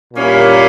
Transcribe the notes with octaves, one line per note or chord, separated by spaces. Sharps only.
A#2 G3 A#3 C#4 E4